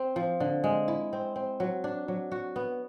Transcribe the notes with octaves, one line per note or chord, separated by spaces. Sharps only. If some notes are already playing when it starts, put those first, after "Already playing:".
Already playing: C4
F3
D3
G#3
E4
C4
C4
F#3
D4
F#3
F#4
B3